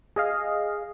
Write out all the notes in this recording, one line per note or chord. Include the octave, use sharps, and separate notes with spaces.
G#4 D#5 F5